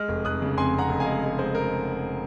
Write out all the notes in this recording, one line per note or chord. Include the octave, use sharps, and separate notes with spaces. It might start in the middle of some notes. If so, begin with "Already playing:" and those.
Already playing: G#3 F6
F1
F1 D#6 F#6
C#3
F2 G#5 C6
F2
F#5 A#5
F1
F5 G#5
G#3
G#3
G#3 C5
A#4